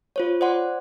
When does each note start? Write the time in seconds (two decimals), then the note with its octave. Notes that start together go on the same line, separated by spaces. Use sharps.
0.16 F4 C5 C#5
0.41 C5 D5 F#5 C6